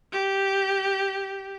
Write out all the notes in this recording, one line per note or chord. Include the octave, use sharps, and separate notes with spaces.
G4